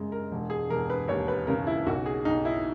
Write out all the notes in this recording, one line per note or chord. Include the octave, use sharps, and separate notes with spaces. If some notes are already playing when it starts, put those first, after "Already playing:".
Already playing: F#2 C#3 G#3
A#4
E1
G#4
E1 A#4
B4
D#2 C#5
B4
C#3 A#4
E4
B1 F#4
G#4
B1 D#4
E4